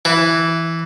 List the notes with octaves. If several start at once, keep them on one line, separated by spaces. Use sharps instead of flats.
E3